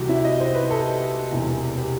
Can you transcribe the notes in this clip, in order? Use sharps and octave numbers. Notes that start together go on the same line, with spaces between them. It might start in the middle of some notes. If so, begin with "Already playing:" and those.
Already playing: C2 C3 E3 F#4 G4
E4
D#5
C5
B4
A4
E1 E2 C3 E3
G4